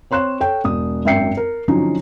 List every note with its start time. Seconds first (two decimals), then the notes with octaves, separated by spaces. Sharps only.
0.11 C4 C#5 C6 F#6 E7
0.40 A4 C#5 G5
0.64 E1 D#6
1.05 G#1 F#2 E5 G5 C7 C#7
1.37 A#4
1.68 D3 F3 F#3 C#4 D#4